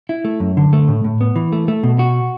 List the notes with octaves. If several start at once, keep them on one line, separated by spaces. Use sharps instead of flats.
E4
A3
F#2
D3
A3
A2
A2
B3
E3
A3
A3
B2
F#4